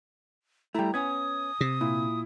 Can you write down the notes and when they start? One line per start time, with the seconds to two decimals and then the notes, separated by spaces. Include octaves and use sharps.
0.75 G3 A3 E4 G5 A#5
0.94 B3 C#4 G#5 D#6 G#6
1.61 C3
1.81 A#2 E4